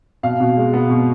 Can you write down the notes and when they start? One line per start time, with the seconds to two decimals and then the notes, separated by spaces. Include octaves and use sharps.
0.23 B2 F5
0.40 B2
0.57 G#3
0.74 B3
0.90 B2